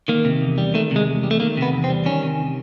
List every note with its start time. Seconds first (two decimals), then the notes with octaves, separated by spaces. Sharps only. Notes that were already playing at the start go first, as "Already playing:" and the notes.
0.08 D#3 A#3
0.25 C3
0.41 E2
0.58 G3
0.74 D#3 A3
0.91 C3 G#3
1.07 E2
1.23 G3
1.31 A3
1.40 D#3 A#3
1.57 C3 B3
1.73 E2
1.84 C4
1.90 G3
2.06 D#3 C#4
2.23 C3